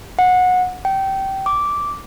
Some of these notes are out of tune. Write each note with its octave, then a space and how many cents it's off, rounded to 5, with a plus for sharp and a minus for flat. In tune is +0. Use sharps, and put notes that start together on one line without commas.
F#5 -20
G5 -20
D6 -10